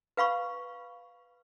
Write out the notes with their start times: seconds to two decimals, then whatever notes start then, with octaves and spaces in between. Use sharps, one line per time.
0.17 B4 F5 B5 C#6